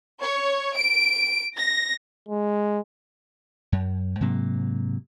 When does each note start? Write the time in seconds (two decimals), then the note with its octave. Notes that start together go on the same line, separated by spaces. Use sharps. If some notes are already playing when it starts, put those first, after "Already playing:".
0.22 C#5
0.76 D7
1.55 A#6
2.28 G#3
3.72 F#2
4.21 G#2 C3 F#3 A#3